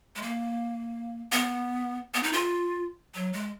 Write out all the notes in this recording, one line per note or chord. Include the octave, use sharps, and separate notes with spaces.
G#3
A#3
B3
B3
D#4
F4
F#3
G#3